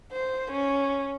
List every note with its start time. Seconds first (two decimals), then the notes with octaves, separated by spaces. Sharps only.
0.12 C5
0.52 C#4